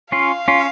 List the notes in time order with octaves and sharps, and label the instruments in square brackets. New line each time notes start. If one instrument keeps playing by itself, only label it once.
[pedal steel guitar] C#4 F4 [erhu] F5
[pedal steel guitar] C#4 F4